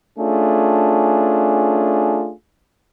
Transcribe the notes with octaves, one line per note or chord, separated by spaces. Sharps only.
A3 C#4 D4 F4 G#4